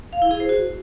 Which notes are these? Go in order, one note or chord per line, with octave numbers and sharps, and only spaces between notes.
F5
E4
G#4
C5
F#4